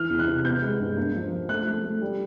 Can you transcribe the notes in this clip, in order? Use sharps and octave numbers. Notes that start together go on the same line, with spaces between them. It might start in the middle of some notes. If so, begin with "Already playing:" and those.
Already playing: E3 F6
E2
F#6
C3
B3 G6
G#3
G2
A#3
F3
F3
A3 F#6
A3
A3
G3